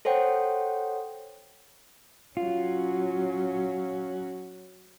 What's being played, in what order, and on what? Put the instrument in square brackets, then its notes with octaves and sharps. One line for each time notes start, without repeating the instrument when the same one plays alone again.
[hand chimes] A4 C5 C#5 F#5 G5
[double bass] F#3 C#4 [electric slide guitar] F4